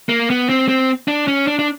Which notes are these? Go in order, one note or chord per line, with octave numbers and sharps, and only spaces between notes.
A#3
B3
C4
C4
D4
C#4
D4
D4